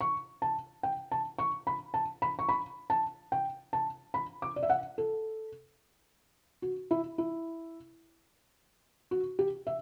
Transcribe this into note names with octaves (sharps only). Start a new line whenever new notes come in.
C#6
A5
G5
A5
C#6
B5
A5
B5
C#6
B5
A5
G5
A5
B5
D6
D5
E5
F#5
A4
F#4
E4
E4
F#4
G4
E5